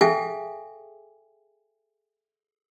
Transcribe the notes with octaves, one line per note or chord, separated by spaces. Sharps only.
G#4 A4 E5 F5 G5 G#5